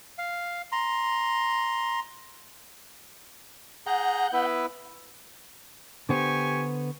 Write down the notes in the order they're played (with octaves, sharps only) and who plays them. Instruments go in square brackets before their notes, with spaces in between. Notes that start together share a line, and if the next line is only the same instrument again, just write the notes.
[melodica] F5
A#5 C6
[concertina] G#4 A#5 [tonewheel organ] F#5 F#6 G6
[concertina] B3 E4 B4
[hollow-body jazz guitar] D3 B3 C5 [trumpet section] G4 G#5 C#6